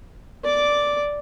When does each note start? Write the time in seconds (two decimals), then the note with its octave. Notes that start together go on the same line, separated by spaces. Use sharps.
0.44 D5 D6